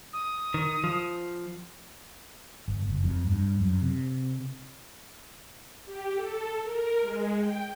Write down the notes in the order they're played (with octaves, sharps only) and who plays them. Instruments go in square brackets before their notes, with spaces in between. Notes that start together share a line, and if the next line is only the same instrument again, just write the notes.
[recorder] D#6
[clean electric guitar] D#3
F3
[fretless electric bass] G1
F#1
F2
G2
F#2
C3
[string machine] G4
A4
A#4
G#3
G5